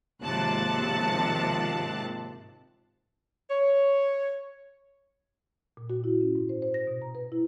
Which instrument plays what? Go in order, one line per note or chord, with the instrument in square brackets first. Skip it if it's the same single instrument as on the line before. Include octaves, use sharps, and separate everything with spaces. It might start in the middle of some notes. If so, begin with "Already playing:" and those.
[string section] G#1 D#2 C3 F3 A5 F#6
[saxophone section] C#5
[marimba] A#2
F#4
E4
C#4
G#2
C5
C5
A#6
B2
A#5
B4
E4